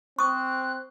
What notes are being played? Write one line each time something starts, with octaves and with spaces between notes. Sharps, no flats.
C4 C#6 D#6 F#6